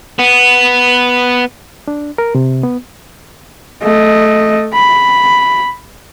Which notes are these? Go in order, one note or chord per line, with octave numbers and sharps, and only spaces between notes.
B3
D4
A#4
C3
B3
A3 D#5
B5